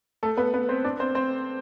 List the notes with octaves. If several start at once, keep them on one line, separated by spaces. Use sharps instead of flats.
A3 A4
B3 B4
B3 B4
C4 C5
D4 D5
C4 C5
C4 C5